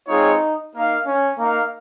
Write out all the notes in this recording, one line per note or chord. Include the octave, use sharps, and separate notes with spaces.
G#3 C4 D#4 F4 G#4 C#5
A#3 D#4 A#4 F5
C#4
A#3 D#4 A#4 F5